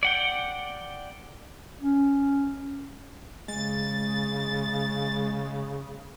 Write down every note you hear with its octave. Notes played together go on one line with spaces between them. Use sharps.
D5 F#5 G5
C#4
C#3 G#3 A6